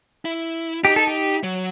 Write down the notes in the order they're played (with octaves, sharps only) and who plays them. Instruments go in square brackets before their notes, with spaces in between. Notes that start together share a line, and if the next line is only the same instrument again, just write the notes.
[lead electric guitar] E4
[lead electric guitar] D#4 [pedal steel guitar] G4
[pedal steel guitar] A4
G4
[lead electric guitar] F#3